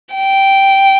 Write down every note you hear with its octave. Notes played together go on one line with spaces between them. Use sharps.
G5